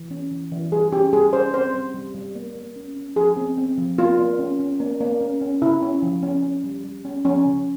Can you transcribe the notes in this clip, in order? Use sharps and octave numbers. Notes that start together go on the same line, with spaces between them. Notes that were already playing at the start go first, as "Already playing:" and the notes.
Already playing: E3
C#4
E3
E3
G3 G#4
C#4 G4
G3 G#4
C#4 C5
C4 C5
G3
G3
G3
A#3
A#3
C#4
C#4
F3 G#4
C4
C4
F3
A#3 F4
A#3
C#4
C#4
A#3
A#3
C#4
C#4
C#3 E4
C#4
F3
C#4
C#4
G3
G3
C#4
F3 C#4
C#3